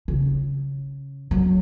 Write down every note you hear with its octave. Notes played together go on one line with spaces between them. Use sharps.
C#3
F#3